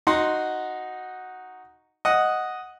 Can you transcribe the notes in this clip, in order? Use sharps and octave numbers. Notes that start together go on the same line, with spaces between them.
D#4 F#4 F#5 C6
D#5 F#5